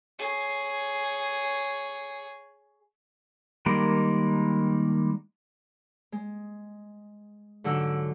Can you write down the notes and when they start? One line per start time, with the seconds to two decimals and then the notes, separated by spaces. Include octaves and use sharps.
0.19 G#4 C#5
3.66 D#3 G3 G#3 A#3 A#4
6.12 G#3
7.64 G#2 D3 F#3 E6